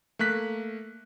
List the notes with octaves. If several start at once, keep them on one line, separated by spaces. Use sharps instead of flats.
A3 A#3 F#6 B6